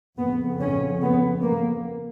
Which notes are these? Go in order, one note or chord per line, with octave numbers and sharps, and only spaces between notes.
F2 C#3 B3
C#4
B3
A#3